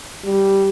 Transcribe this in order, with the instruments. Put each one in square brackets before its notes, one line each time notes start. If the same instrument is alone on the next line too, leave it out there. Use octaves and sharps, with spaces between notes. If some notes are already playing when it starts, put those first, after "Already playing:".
[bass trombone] G3